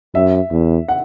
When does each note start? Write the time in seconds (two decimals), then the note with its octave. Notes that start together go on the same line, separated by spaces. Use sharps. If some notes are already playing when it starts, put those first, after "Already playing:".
0.14 F#2 E5
0.52 E2
0.88 F#5